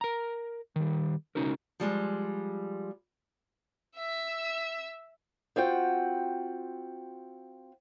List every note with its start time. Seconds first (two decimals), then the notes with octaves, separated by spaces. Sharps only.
0.01 A#4 A#5
0.76 D#3 G3
1.35 C#2 C3 C#4 D#4 F#4 A#4
1.80 F3 G3 G#3
3.96 E5 E6
5.56 C4 F4 F#4 G5